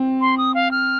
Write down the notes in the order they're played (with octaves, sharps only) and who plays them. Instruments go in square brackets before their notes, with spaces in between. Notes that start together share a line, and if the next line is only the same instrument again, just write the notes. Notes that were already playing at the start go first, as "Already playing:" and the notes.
Already playing: [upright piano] C4
[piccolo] C6
D#6
F5
F6